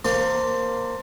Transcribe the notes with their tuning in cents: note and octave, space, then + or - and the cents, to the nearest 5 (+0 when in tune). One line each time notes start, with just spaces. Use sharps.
A#3 +0 C5 +0 A5 +30